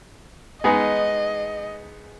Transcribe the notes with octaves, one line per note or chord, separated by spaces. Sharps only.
G#3 B3 D#4 G#4 D#5